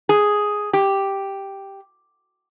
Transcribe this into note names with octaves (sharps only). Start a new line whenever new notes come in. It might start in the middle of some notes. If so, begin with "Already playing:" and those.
G#4
G4